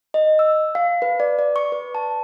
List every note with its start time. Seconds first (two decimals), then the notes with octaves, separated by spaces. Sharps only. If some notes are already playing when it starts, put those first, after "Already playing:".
0.14 D#5
0.39 E6
0.75 F5
1.02 B4
1.20 D5
1.39 D5
1.56 C#6
1.72 B4
1.95 A5